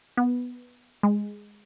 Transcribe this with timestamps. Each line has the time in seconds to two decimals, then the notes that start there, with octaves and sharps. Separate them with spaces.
0.17 B3
1.03 G#3